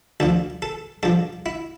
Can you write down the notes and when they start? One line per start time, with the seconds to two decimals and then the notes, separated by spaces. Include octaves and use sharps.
0.20 D2 D3 F3 A4
0.62 A4
1.03 G2 F3 A4
1.46 E4